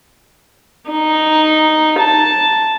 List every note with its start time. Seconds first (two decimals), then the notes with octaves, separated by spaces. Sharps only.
0.90 D#4
1.99 A5